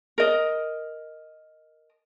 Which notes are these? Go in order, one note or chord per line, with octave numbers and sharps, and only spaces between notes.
A#4 D#5